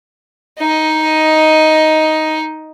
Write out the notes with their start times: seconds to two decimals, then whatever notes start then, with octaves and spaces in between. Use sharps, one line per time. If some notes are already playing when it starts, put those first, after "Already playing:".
0.59 D#4 D#5